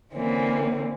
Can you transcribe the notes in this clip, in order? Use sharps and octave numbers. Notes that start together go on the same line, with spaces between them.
D3 E3 A#3 C4 C#4